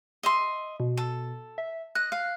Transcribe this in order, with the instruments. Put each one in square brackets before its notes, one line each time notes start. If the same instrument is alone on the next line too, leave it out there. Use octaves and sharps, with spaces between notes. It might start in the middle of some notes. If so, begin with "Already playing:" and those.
[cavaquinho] D#5 E5 C6
[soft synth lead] B2
[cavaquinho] A4
[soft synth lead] E5
[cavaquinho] D#5 [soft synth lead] F#6
[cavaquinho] F5